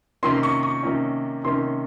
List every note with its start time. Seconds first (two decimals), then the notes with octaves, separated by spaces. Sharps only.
0.23 C3 D#3 A#3 C#4 C6
0.43 C#6
0.63 C#6
0.83 C3 D#3 A#3 C#4
1.44 C3 D#3 A#3 C#4 C6